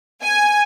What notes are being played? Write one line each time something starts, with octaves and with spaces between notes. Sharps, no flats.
G#5